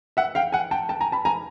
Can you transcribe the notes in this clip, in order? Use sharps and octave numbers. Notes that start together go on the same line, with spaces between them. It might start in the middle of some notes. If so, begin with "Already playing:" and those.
E5 F#5
F5 G5
F#5 G#5
G5 A5
G5 A5
G#5 A#5
A5 B5
G#5 A#5